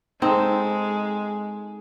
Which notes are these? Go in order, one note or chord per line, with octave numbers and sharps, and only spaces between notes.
G#3 C4 D#4 A4